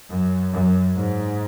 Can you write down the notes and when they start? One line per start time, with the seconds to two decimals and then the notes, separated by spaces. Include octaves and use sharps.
0.10 F#2
0.53 F#2
0.96 G#2